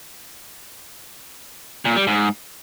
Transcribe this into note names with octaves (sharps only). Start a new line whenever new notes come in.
A#2
G3
G#2